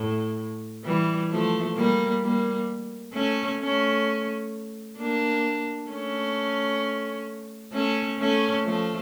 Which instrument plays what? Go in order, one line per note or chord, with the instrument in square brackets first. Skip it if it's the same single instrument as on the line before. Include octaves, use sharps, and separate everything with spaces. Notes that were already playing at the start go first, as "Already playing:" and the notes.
Already playing: [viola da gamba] A2
E3 G3
F3 A3
G3 A#3
G3 A#3
A3 C#4
A3 C#4
A#3 D4
A3 C#4
A3 C#4
A3 C#4
F3 A3